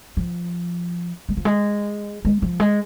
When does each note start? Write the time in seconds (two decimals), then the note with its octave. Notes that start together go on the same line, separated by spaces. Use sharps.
0.17 F3
1.29 G#3
1.37 F3
1.45 G#3
2.25 G#3
2.42 F3
2.60 G#3